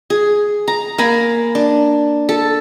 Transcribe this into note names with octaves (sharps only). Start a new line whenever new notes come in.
G#4
A#5
A#3 G#5 A#5 B5
D4
A4